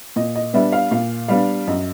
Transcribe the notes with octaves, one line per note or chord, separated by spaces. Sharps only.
A#2 D#5
D#5
G3 B3 D4 E5
F5
A#2 F5
G3 B3 D4 F5
F#2 D#5